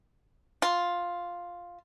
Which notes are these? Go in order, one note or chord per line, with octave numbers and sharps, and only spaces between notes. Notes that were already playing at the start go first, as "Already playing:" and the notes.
F4